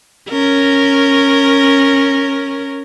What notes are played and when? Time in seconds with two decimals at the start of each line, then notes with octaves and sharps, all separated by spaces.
0.30 C#4 A#4